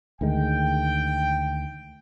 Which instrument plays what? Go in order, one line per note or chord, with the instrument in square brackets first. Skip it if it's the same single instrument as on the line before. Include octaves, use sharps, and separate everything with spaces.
[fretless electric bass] D2 D#3 G#3 [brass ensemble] G5